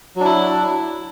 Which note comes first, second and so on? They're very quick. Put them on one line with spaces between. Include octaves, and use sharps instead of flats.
F#3 D4 E4